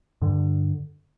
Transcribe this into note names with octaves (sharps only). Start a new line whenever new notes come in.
G2 D3